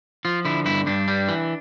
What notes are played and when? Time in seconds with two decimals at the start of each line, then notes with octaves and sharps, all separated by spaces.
0.25 F3 F4
0.45 D3 E4
0.66 G2 E4
0.87 G2 D4
1.08 G3
1.28 E3